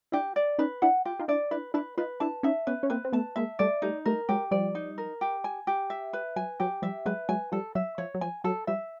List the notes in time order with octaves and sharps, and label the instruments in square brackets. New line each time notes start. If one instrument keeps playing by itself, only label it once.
[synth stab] D4 E4 [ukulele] G4
[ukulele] D5
[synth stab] C#4 D#4 [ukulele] B4
[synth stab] D4 E4 [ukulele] F#5
[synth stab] F4 [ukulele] G4
[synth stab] D#4 F4
[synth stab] D4 E4 [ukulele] D5
[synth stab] D4 E4 [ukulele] B4
[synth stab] D4 E4 [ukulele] B4
[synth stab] D#4 F4 [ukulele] B4
[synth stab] D4 E4 [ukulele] A5
[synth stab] C#4 D#4 [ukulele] E5
[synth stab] B3 C#4 [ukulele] B4
[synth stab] C#4
[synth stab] A#3 C4 [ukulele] B4
[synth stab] C4
[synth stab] A3 B3 [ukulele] A5
[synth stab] G#3 A#3 [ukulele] E5
[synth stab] G3 A3 [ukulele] D5
[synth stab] G3 A3 [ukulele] D#4
[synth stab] G3 A3 [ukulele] A#4
[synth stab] F#3 G#3 [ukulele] G4
[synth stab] F3 G3 [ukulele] D5
[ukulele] D#4
A#4
G4
G#5
G4
E5
B4
[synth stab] F#3 [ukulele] G#5
[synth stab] F#3 [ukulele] G4
[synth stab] F3 G3 [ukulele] E5
[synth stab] F#3 G#3 [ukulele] B4
[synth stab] F#3 G#3 [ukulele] G#5
[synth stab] F3 G3 [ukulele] A4
[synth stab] F#3 [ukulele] E5
[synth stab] F3 [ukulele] C#5
[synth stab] F#3
[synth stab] F3 [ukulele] G#5
[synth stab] F#3 [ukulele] A4
[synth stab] F3 G3 [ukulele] E5